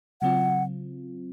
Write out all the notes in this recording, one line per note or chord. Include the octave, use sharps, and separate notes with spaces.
C#3 F#3 C4 F4 F#5